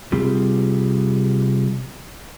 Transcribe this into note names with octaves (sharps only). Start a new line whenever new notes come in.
C3 G3 C4 F4 G4 G#4